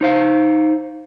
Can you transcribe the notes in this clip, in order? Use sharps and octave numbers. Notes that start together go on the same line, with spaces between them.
D#4 C5 F5